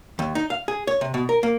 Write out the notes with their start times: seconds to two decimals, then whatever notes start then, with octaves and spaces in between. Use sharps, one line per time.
0.19 D#2
0.35 D#4
0.50 F5
0.68 G#4
0.87 C#5
1.01 C3
1.14 B2
1.29 A#4
1.43 A#3